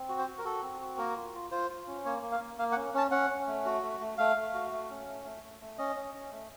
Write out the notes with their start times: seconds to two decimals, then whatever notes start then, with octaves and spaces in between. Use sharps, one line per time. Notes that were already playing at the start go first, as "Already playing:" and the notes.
Already playing: C4
0.09 F#4
0.18 C5
0.27 F#4
0.38 A#4
0.45 F#4 A4
0.63 C4
0.81 F#4
0.98 A#3 A#4
1.16 F4
1.34 F4
1.51 F4 C5
1.70 F4
1.87 C#4
2.05 A#3 C#5
2.22 A#3
2.32 F5
2.40 A#3
2.58 A#3 F5
2.72 F#5
2.77 C#4
2.94 C#4 A5
3.11 C#4 F#5
3.30 C#4
3.47 A3
3.66 F#4
3.82 A3
4.00 A3
4.18 A3 F5
4.36 A3
4.54 F#4
4.72 A3
4.90 C#4
5.07 A3
5.25 A3
5.43 A3
5.61 A3
5.78 C#4 D#5
5.96 C#4
6.14 C#4
6.31 A3